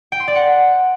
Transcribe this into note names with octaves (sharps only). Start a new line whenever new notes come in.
G5
C6
D5
F#5